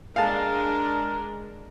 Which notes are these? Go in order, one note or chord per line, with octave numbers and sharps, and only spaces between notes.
G#3 D4 A#4 F5 A5